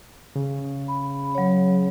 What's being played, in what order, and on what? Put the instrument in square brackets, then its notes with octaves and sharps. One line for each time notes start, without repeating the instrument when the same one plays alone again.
[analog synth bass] C#3
[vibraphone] B5
F#3 C#5